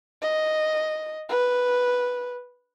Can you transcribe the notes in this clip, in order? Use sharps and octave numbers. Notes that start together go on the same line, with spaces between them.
D#5
B4